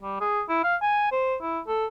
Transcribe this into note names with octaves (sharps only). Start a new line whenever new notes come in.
G3
G#4
E4
F5
G#5
C5
E4
A4